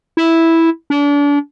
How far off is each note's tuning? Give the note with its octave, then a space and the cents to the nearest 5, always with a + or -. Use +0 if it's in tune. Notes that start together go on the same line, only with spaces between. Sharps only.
E4 -5
D4 -35